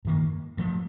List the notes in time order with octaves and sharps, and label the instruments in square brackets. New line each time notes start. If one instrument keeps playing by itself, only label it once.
[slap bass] G2 D#3 A#3
G2 F3 A3